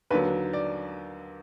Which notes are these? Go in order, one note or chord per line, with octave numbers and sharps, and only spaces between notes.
D#2 D3 F#3 B4
D5